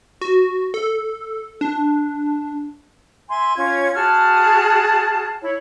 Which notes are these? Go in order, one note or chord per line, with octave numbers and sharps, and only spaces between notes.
F#4
A4
D4
E5 G#5 C6
C#4 F4 C#5 G#6
F#4 G#4 A5 F6
E4 C#5